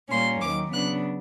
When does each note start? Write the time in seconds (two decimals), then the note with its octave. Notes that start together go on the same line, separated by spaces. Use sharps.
0.10 A#2 G3 A#3 C#4 C6
0.41 D#2 D#3 F#3 D6
0.72 C#3 F#3 B3 D4 F#6